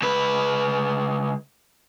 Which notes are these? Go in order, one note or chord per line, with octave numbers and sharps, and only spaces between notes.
C#2 B4